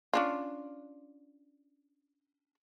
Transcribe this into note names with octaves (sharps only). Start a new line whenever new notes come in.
C#4 D4 F4